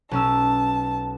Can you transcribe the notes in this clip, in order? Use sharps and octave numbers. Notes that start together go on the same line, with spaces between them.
B1 C#4 A5 E6